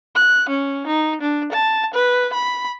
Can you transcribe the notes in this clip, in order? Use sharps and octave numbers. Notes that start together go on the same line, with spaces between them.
F#6
C#4
D#4
D4
A5
B4
B5